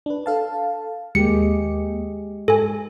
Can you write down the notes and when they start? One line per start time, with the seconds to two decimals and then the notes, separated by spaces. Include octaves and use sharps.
0.06 D4 B4
0.26 A4 F5 A5
1.15 D#2 G#3 A#3 G4 C#7
2.48 G#2 A4 G#5